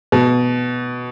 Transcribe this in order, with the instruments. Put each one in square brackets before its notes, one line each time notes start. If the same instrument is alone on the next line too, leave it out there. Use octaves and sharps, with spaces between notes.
[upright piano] B2